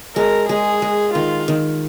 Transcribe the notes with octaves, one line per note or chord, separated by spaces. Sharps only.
G#3 A#4
G#3 G#4
G#3
D#3 F4
D#3